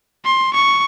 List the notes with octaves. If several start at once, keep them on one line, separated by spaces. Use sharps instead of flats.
C6
C#6